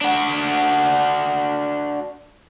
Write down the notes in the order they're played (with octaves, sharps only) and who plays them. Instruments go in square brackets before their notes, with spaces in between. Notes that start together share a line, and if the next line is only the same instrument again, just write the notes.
[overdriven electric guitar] D4 F#4